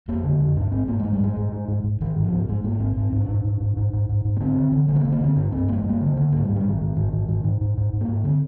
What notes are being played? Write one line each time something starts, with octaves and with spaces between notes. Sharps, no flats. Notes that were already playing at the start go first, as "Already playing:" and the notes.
F2 A#3
D3
F2
G#2 D4
G#2 C4
G#2 A#3
G#2 G#3
G3
G#2 G#3
G#2
G#2
G#2
G#2
G#2 D#3
G#2
F3
G#2
G#2 G#3
G#2 A#3
G#2 C4
G#2 C4
G#2
D4
G#2
G#2
G#2
G#2
G#2
G#2
G#2
A#3
D3 C4
D3
D3
D3 A#3
C4
A#3
D3
A#3
D3 C4
G2 D4
G2 C4
G2 A#3
G#3
G2 A#3
D3
D3
G#2 A#3
G3
G#2
G3
G#2 D#3
G#2
G#2
G#2
G#2
G#2
G#2
G#2
G#2
A#3
G#2
D3 C4